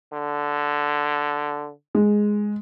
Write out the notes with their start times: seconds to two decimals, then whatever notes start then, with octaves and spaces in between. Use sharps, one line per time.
0.13 D3
1.95 G#3